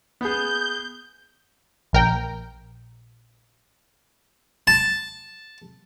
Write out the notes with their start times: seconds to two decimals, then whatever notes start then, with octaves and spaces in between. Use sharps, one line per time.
0.21 B3 G#4 G6
1.93 A#1 A#4 G5
4.67 A5